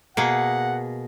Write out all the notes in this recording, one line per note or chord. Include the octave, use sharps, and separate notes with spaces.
B2 A#3 G#4 F#5